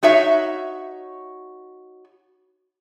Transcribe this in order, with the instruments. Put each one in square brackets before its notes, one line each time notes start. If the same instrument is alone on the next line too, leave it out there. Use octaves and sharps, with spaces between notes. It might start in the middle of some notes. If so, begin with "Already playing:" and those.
[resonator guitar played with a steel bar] D#4 F#4 C#5 E5